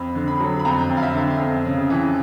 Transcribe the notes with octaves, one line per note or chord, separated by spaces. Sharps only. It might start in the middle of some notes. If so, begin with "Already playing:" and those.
Already playing: F2 B5
D3
B5
F#3
B5
F2 A#5
F2
F5
E5
D3
F2
C#3
E3